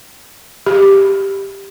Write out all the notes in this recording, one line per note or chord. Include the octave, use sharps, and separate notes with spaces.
G4